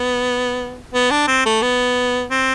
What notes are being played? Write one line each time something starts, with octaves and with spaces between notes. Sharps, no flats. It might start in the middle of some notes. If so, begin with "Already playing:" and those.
Already playing: B3
B3
D4
C4
A3
B3
C4